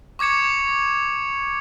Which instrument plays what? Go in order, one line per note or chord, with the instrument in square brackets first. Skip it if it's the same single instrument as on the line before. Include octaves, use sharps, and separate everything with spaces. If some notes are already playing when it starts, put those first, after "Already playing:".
[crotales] C#6 D6 G#6 C#7 E7